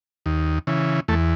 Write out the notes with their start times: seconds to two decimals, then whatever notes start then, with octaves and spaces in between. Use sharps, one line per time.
0.26 D#2
0.67 C#3 E3
1.08 E2 A3